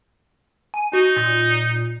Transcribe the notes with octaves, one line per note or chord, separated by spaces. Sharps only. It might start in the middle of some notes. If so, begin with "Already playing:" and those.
G#5
D#4 F#4
A#2